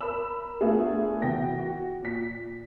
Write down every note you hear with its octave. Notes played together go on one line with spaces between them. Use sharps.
A#4 B5 E6
A3 B3 D4 F4 G#4 A#4
E3 B3 F#4 G5 A#6
F#4
A#2 B6